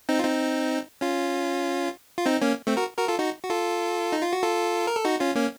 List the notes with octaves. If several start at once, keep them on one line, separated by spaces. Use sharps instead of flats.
C4 D#4
F4
C4 D#4
C#4 F4
F4
C4 D#4
A#3 C#4
A3 C4
F#4 A#4
F#4 A#4
F4 A4
D#4 F#4
F#4
F4 A4
D#4
F4
F#4
F4 A4
A#4
A4
D#4 F#4
C#4 F4
A#3 C#4